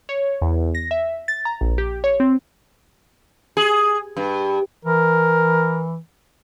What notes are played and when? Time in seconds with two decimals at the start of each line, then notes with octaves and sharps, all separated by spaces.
0.09 C#5
0.42 E2
0.75 A#6
0.91 E5
1.28 A6
1.45 A#5
1.61 A#1
1.78 G4
2.04 C#5
2.20 C4
3.57 G#4
4.17 G2
4.85 E3 A#4